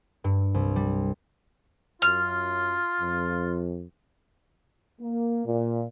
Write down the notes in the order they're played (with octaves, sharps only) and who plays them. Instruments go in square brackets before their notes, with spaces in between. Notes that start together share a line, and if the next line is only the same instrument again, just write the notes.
[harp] G2
C2
G3
[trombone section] F#2 [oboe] F4 [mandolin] F6
[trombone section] F2
[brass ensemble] A#3
A#2